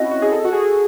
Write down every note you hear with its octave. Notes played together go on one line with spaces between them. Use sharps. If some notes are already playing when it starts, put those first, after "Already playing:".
Already playing: C4 C#4 E4 F#4 D#5
F#4
G#4
A4
F#4
G#4